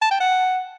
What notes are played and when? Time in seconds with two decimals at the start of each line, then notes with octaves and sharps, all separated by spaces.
0.02 A5
0.11 G5
0.20 F#5